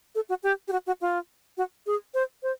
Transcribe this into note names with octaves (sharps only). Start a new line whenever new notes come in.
A4
F#4
G4
G4
F#4
F#4
F4
F#4
G#4
C5
C5